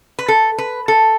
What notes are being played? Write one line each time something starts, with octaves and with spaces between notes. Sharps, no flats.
B4
A4
B4
A4